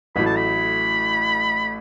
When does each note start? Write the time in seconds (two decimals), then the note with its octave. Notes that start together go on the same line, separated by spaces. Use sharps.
0.15 A1 A2 F#3 A3 B5
0.26 A5
0.36 B5